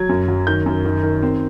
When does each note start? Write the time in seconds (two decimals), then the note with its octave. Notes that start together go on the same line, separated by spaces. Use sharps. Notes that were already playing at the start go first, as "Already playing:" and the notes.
Already playing: F#3 G#6
0.09 F#2
0.28 F#3
0.47 D#3 G6
0.66 F#2
0.85 D#3
1.03 D#3
1.23 C4